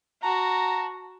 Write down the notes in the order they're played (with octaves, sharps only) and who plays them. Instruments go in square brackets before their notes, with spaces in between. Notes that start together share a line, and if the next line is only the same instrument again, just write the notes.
[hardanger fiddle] F#4 [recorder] A5 [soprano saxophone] A#5